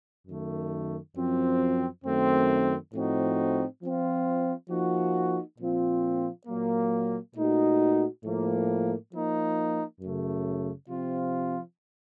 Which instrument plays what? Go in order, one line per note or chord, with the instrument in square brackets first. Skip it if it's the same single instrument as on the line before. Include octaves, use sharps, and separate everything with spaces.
[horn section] F#2 D#3 A3
F#2 F3 C4
F#2 D#3 A3 C4
A2 F3 C4 D#4 F#4
F3 C4 F4
F3 A#3 D#4 F#4
A#2 F3 C4 F4
A#2 F#3 A#3
A#2 A3 D#4 F#4
A2 F3 A#3
F3 A#3 D#4
F#2 C#3 A3
C3 F3 C4 F4